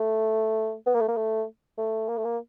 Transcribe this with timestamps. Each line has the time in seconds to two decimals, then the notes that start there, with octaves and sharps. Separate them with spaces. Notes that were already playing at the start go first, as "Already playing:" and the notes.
Already playing: A3
0.86 B3
0.95 A#3
1.01 A3
1.08 A#3
1.17 A3
1.78 A3
2.09 A#3
2.18 A3
2.25 A#3